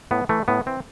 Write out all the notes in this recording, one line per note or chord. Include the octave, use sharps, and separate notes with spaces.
A2 B3
E3 A3
A2 B3
E3 C4